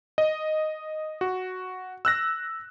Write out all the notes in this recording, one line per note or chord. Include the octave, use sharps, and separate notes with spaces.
D#5
F#4
E6 F#6 A#6